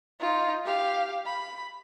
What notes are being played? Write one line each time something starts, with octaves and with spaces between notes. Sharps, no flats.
D#4 F4
G4 F5
B5